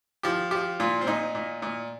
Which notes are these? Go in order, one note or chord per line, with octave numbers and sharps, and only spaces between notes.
F3 G4
F3 G4
A#2 F4
C4
A#2 D#4
A#2
A#2